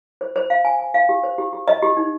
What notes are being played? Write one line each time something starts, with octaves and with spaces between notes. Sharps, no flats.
C5
C5
F5
G#5
G#5
F5
G4
C5
G4
G4
D#5
G4
D#4